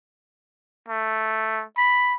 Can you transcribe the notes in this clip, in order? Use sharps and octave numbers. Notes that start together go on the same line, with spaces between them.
A3
B5